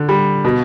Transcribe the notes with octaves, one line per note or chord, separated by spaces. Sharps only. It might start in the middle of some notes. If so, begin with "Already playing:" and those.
Already playing: D3
G3
B2